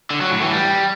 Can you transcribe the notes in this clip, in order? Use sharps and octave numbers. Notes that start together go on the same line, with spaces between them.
D3
F#3
A2
E3
G3